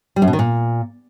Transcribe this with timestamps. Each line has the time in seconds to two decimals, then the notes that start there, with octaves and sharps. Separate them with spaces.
0.16 G3
0.22 F#2
0.28 B2
0.33 D#3
0.39 A#2